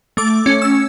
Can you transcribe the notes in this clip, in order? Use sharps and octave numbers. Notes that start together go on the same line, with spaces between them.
A3 D6
C#4
E6